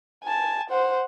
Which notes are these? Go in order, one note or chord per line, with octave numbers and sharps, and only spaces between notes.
G#5 A5
C5 F#5